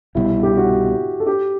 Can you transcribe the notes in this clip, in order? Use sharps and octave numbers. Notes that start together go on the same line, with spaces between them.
C2 B2 G3 E4
G4
F#4
A4
G4